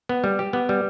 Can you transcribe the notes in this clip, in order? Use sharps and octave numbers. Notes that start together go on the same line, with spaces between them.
B3
G3
G4
B3
G3